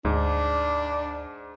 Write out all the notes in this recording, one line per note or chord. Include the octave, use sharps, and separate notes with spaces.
D2 G#2 D4